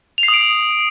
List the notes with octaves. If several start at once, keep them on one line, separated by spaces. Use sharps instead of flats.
F7
C7
D#6
D7